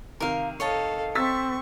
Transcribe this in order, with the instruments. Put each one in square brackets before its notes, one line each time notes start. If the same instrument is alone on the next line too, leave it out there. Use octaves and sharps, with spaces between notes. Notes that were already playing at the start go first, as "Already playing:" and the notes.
[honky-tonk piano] C3 D#3 [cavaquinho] A#4 F5
[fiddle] A4 F5 [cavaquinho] C#5 D#5 A5
[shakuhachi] C4 [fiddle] C#6 [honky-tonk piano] E6 A6 B6